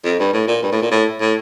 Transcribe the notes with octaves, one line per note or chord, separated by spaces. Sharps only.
F2
G2
A2
A#2
G2
A2
A#2
A2
A2